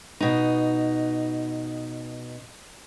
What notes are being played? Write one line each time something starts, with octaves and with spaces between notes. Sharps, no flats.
B2 D#4